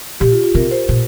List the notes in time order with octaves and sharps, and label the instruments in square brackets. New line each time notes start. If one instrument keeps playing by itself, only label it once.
[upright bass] A#2 [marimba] G4
[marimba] F4
F4
[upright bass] C3 [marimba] A#4
[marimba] C5
[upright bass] A#2